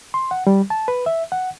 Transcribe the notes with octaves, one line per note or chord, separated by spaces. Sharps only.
C6
F#5
G3
A5
B4
E5
F#5